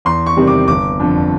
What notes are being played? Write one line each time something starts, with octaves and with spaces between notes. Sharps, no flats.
E2 C6
C#6
C3 D#3 G3 C4
D6
G1 D6
F2 D3